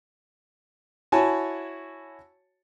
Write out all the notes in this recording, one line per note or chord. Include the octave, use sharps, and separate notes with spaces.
E4 F#4 C#5 G#5 A5